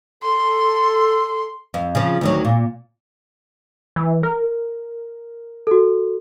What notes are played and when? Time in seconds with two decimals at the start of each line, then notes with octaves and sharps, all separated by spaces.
0.23 A4 C6
1.74 F2
1.95 C#3 F3
2.21 D2 D#3 F#3
2.45 A#2
3.96 E3
4.23 A#4
5.67 F#4 A4